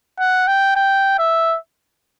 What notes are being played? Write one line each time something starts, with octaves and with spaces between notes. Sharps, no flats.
F#5
G5
G5
E5